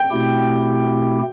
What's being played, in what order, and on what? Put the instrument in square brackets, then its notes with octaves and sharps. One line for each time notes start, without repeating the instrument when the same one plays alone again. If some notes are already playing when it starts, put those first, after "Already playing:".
Already playing: [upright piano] G5
[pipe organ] B2 A3 C4 E4 G4